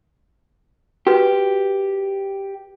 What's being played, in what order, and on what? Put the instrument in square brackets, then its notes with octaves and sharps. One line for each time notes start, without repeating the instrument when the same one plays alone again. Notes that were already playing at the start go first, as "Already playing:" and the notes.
[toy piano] F#4 B4 [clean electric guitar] G4